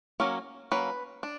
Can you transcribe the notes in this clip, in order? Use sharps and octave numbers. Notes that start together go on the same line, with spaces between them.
F#3 A#3 C#4
F#3 A#3 C#4 B4
D4